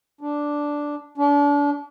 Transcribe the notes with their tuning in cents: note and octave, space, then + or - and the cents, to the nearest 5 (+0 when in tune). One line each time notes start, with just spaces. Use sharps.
D4 -5
D4 -35